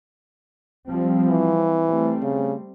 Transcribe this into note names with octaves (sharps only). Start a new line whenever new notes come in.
F3 G3 C4
E3
G3 A3 C4
C#3